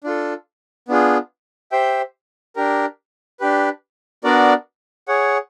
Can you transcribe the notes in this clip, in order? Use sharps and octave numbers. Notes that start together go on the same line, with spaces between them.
D4 F4 A4
B3 D4 F4 G#4
G4 C5 E5 G5
D4 G4 A#4
D4 G4 B4
B3 D4 F#4 A#4 D5
G#4 C#5 F#5